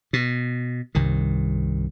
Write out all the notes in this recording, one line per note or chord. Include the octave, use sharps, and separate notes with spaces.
B2
C2 G2 D#3